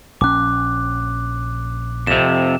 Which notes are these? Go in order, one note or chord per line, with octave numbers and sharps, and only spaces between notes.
A#1 C#4 D6 F#6
F2 C3 E7